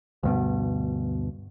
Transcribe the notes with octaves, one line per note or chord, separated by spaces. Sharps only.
D2 G2 B2